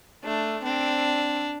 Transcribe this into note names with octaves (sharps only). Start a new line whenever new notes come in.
A3 D4
C4 D4